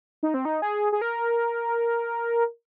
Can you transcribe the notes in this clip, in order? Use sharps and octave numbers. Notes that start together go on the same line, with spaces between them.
D#4
C4
D#4
G#4
G#4
A#4